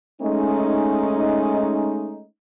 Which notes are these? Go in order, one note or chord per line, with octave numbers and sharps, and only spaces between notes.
G#3 A3 C#4 D#4